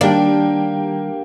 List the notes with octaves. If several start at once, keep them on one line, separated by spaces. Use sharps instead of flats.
D#3 G3 A#3 D4 G4